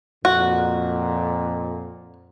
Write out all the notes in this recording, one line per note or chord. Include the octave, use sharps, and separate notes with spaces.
F2 A#2 F#4